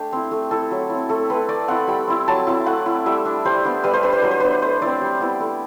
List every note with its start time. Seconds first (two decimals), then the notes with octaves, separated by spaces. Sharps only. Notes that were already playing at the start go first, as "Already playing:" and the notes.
Already playing: A3 D4 G4
0.12 C4 E4
0.31 A3
0.51 E4 A4
0.71 F#3
0.90 C4 E4
1.09 A3 A4
1.30 C4 E4 B4
1.49 A3 D5
1.68 C4 E4 F#5
1.88 G3 B5
2.07 C4 E4
2.28 F#3 A5
2.47 C4 E4
2.66 A3 F#5
2.86 E4
3.06 G3 E5
3.25 D4
3.45 G3 C5
3.64 B3 D4
3.84 G3 B4
3.93 C5
4.03 D4 B4
4.13 C5
4.22 F#3 B4
4.31 C5
4.40 B3 D4 B4
4.62 A3 C5
4.82 C4 E4 D5
5.01 G3
5.21 B3 E4
5.40 A3